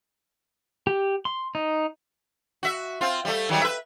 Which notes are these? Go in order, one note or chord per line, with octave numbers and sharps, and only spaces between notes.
G4
C6
D#4
F#4 E5
C4 F4
G3 A3
D#3 F#3 G3
B4 E5